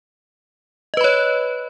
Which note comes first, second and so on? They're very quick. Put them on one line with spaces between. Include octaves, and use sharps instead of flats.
D#5 B4 B5 C#5